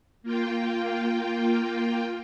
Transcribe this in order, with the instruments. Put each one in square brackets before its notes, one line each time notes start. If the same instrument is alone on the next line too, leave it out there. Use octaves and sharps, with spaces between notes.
[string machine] A#3 F4 G5